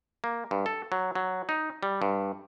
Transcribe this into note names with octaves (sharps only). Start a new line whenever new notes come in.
A#3
G2
A4
F#3
F#3
D#4
G3
G2